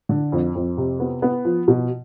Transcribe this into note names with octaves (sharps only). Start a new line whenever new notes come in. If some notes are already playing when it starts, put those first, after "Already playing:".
D3
F2
F2
C3
B3
B3
F3
B2